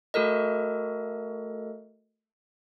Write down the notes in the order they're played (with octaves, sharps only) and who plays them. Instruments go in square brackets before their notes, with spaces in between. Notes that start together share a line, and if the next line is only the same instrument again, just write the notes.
[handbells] A3 F#4 A4 A#4 D#5